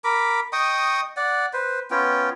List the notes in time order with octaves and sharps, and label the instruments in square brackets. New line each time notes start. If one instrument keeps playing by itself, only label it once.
[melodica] A#4 B5 D6
D#5 G5 C#6 D#6
D5 F#5
B4 C5
B3 C#4 F4 G5